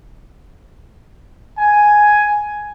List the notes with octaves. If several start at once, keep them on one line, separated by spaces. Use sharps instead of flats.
G#5